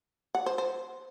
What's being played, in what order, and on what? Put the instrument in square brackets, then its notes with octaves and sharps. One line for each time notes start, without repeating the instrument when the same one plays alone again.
[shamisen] F#5
C5
C5